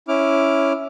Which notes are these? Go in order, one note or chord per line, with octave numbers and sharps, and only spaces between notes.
C#4 E4 D6 F6